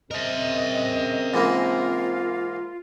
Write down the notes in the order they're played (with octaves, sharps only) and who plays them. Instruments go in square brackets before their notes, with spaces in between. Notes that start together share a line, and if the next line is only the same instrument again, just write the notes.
[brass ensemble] C#3 C4 [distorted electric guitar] A#4 E5 [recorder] D#5
[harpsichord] G#2 E3 A#3 [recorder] F4